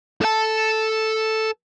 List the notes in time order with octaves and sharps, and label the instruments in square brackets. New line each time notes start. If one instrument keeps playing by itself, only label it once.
[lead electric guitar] A4 A5